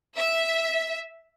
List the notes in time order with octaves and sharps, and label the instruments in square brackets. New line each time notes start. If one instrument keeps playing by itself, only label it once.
[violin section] E5